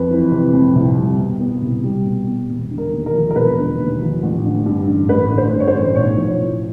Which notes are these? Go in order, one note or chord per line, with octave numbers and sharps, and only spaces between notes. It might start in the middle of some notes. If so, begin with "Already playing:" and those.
Already playing: F2 B4
E3
C3
F2
C2
G3
B2
B3
C2
G3
B2
B3
E1
D3
A#4
D#2
A#4
F3
A#4
E1 B4
D3
D#2
F3
A1
D3
G2
A1
A1 B4
D3
C5
G2
C#5
C5
A1
B1 C#5
F3
A2